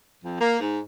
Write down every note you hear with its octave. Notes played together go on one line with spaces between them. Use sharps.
F2
A#3
G#2